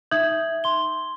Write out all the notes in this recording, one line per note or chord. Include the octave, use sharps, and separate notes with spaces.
D#4 E5 D#6 G6 G#6 F#7
C6 G7